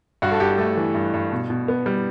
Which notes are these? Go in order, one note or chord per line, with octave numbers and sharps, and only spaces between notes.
G2 F#4
A4
G2 G4
A3 A4
E3
G2
G2
B2
B2
B3
G3